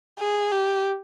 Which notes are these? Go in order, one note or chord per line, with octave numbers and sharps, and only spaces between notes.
G#4
G4